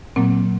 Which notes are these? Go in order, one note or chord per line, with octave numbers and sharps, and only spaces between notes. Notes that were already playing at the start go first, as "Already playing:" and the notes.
A#2 F#3 A#3 C4